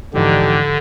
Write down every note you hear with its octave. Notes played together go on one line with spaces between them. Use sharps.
G#2 D3 E3 F3 D4 D#4 G4